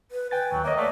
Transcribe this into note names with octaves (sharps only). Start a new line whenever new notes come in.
B4
B4 G5 G#5 A6
D#2 F#3
A#3 C#5 D#5 E5
A3 D5